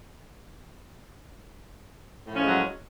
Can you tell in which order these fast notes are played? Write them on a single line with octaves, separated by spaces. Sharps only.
A2 F3 C#4 G#3 F#3